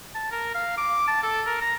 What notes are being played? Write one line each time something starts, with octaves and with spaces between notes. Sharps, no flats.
A5
A#4
F5
D6
A5
A4
A#4
A#5